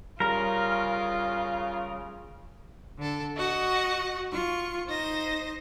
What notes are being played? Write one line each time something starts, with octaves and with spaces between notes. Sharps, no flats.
C#3 G3 F4 A#4 A#5
D3 A4
F#4 D#5 F#5
F4 C#6
D#4 C5 D#5 A#6